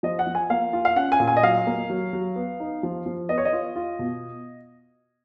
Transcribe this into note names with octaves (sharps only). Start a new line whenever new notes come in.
F3 D#5
F#5
F3
G#5
A#3 F5
F4
F5
C#4 F#5
G#5
A#2
G#5
D#5
F#3 F5
A#3
F#3
F#3
B3
D#4
F3
F3
B3 D#5
C#5
D#5
F4
F4
B2